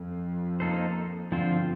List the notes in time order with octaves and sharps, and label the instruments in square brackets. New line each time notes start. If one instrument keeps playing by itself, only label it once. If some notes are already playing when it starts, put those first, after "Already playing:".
Already playing: [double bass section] F2
[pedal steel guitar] A#3 D#4 A4 C5
[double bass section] G2 [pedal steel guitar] D3 F3 C4 F4 C5